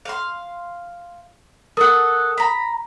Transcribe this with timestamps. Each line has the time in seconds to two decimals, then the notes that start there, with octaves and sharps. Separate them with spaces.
0.05 F5 C6
1.77 A4 A#4 F#5 D#6
2.38 A#5 B5